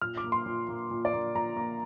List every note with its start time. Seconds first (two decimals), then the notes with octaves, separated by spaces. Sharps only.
0.02 A#2 F6
0.17 D6
0.24 A#3
0.32 C6
0.46 A#2
0.69 A#3
0.91 A#2
1.05 D5
1.13 A#3
1.35 A#2 A#5
1.57 A#3